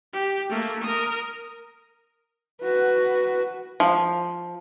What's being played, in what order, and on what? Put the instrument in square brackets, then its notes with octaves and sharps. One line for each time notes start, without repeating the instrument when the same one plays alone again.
[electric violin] G4
A3 A#3
A#4 D#6
[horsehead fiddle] F#4 B4
[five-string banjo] F3